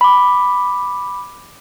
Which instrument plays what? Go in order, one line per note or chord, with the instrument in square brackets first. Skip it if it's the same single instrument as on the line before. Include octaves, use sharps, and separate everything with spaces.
[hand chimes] B5 D6